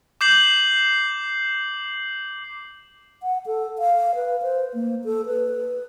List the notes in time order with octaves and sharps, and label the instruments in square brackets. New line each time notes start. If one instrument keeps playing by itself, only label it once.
[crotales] D6 G6 C7 F#7
[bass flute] F#5
A4
F5
B4
C5
A#3
A4
B4